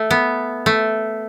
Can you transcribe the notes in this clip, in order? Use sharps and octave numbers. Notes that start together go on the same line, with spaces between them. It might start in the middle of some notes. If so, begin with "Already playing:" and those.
Already playing: A3
B3
A3